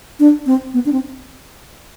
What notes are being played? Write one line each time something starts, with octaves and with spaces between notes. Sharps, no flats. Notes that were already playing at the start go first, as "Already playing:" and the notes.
D4
C4
B3
D4
C4